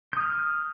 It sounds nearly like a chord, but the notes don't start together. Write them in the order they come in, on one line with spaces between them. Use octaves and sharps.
G6 D#6 F6